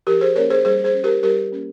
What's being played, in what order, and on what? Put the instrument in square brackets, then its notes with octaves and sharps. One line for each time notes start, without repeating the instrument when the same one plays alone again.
[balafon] F3 G4 A#4
G#4 C5
A#3 C#4 A#4 C#5
G#4 C5
G3 G#4 C5
G#4 C5
C#4
G4 A#4
G3 G4 A#4
A#3 C#4